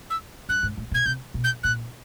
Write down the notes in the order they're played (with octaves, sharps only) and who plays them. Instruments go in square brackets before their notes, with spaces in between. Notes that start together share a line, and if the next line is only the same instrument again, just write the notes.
[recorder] E6
[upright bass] G2 [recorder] F#6
[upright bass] G#2
A2
B2
[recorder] G#6
[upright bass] C3 [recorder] G6
[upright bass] B2
[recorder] G6
[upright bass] A#2 [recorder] F#6